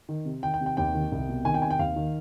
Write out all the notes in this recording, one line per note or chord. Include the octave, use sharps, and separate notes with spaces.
D#3
C3
D#3 G5
G5
C3
G5
D#2 G5
D#3
C2
B2
D#3 G#5
G5
C3 G#5
G5
D#2 F5
D#3